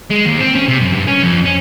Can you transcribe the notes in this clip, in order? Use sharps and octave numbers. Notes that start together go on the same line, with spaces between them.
G#3
D#2
C4
C#4
C3
F#2
G2
C#4
F2
C#4